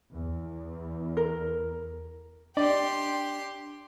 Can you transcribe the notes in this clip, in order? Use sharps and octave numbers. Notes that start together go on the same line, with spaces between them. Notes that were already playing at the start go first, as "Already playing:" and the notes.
E2
A#4
D4 G4 D5 C6